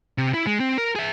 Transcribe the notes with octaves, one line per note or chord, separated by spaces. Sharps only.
C3
E4
G#3
C4
A#4
G#4 E5